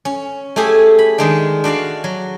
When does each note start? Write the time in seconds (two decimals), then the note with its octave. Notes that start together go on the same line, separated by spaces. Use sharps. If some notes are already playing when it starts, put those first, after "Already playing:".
0.05 C#4
0.56 A3 E4 G4 G#4 G#5
0.99 B5
1.18 D#3 G#3 D4
1.64 D4 F#4 D5 F5
2.04 F#3